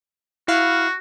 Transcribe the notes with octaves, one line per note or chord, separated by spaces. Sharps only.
E4 F#4 F5